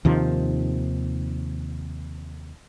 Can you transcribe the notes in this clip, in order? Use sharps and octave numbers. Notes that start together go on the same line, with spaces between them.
D#2 C3 D#3 F3